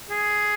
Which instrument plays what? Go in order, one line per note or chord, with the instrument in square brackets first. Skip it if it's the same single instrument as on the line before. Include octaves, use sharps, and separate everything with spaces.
[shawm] G#4